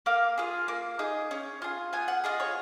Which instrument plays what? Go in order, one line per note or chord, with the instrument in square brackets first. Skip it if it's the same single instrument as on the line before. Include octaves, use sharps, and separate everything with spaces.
[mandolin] A#3 F5
F4 G#4
A#3
D#4 G#4
C#4
F4 G#4
B3 G#5
F#5
F4 G#4 D#5
C#5